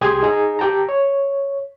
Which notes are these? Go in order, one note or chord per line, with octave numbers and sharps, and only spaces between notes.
C2 G4 G#4 C6 D#6 G#6
D#4 G#4 A#5
G4 G5 A5 A#5
C#5